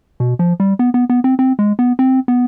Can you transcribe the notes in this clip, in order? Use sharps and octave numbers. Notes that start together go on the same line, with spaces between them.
B2
F3
G3
B3
B3
B3
C4
C4
G#3
B3
C4
B3